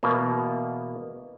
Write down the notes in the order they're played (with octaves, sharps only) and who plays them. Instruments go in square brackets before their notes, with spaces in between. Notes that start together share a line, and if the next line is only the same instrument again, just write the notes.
[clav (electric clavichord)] E2 B2 A#3